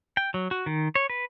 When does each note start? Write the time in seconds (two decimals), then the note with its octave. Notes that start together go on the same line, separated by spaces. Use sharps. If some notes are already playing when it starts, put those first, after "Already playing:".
0.17 G5
0.34 F#3
0.51 F#4
0.66 D#3
0.95 C#5
1.10 B4